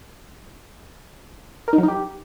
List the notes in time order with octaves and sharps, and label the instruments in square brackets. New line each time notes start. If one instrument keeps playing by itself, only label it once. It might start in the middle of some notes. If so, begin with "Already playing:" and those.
[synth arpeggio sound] A#4
D#4
F#3
D#4
G4